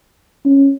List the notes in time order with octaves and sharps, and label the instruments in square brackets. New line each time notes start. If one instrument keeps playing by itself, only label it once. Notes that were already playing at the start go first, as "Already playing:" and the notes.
[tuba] C#4